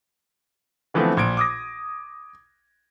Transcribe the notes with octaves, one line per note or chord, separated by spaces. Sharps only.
D3 E3 F3 A3 B3 C4
A#1 G#6 D7
D6 D#6 A#6